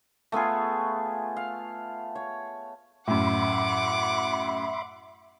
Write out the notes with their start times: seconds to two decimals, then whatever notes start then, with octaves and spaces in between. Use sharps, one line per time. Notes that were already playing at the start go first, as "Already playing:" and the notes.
0.32 A3 B3 F4 G#4
1.36 F5
2.15 C#5
3.07 F#2 A2 E5 F#5 B5 C6 D6